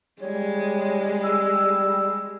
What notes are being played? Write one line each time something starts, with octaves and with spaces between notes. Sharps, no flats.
G3 G#3 C#5
E6